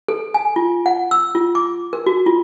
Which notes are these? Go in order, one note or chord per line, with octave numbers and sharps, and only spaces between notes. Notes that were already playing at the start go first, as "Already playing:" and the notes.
A4
G#5
F4
F#5
E6
F4
D6
A#4
F#4
F4